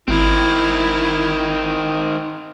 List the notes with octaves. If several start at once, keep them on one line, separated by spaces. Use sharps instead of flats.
G#1 D#3 C4 E4